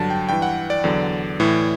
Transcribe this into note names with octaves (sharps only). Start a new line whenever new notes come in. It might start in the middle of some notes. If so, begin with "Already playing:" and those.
Already playing: G2 D3 F#3 A5
G5
G2 E3 G5
F#5
D5
E2 D3 F#3
A2 E3